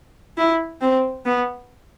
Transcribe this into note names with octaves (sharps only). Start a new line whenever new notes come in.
E4
C4
B3